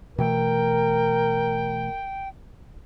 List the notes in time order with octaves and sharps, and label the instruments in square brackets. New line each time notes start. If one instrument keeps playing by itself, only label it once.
[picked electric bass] B2 E3 A3 [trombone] A#4 [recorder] G5